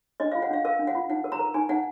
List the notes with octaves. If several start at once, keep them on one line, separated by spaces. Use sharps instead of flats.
D4 D#5
F4 F5
F#5
D4 F5
A#4 F5
D4
F#5
F4
D#4 F#5
A#4
A#5
A#4
D#4 G#5
D#4 F#5